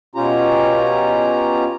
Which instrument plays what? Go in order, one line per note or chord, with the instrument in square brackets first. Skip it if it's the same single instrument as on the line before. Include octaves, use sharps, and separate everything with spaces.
[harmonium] B2 C#4 F4 G4 A#5